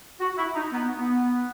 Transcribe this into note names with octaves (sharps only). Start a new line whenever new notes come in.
F#4
E4
D#4
B3
B3